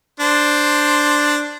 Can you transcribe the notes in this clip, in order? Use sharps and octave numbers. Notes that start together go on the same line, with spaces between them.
D4 C5